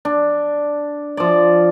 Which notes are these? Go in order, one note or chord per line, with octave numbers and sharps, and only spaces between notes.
D4
F3 D5